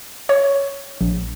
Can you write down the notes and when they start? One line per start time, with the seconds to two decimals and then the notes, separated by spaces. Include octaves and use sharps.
0.29 C#5
1.01 A#1